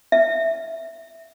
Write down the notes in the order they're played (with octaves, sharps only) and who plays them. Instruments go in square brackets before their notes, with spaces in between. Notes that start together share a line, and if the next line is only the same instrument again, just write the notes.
[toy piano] E5